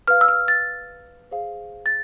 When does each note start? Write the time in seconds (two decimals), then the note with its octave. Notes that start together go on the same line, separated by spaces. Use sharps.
0.08 B4 F5 F6
0.21 E6
0.28 F6
0.48 A6
1.31 G#4 C5 F5
1.86 A6